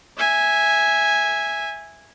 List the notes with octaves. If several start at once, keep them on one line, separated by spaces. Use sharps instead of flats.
E5 G#5